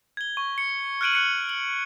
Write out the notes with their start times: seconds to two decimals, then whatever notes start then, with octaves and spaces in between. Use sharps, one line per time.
0.17 G#6 G7
0.37 C#6
0.58 C#7
1.01 F6 F#6 G#6 D7 D#7 F#7
1.12 F#6 C#7 D#7 F#7
1.49 F#7